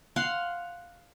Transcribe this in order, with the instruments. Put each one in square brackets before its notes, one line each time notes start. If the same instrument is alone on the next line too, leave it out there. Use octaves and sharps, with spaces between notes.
[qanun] F5 F#5 C6